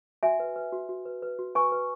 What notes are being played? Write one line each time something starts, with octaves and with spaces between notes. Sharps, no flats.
F#4 E5 G#5
B4
B4
F#4
F#4
B4
B4
F#4
B4 G#5 C#6
B4